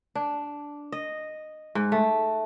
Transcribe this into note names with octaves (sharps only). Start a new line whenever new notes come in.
D4
D#5
G#2
A3